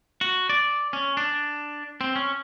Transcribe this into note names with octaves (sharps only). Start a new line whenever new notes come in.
F#4
D5
C#4
D4
C4
C#4